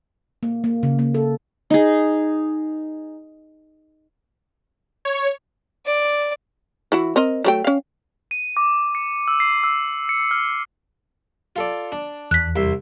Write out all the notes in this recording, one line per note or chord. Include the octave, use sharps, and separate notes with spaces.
A#3
A#3
C#3
A#3
A4
D#4 G#4
C#5
D5
E3 E4 F#4
C4 A#4 D#5
F#3 A3 G5
C#4 F5
D#7
D6
C#7
E6
C7
E6
C#7
F6
F4 A4 D5
D4
E2 F#6 B6
C2 E5 C6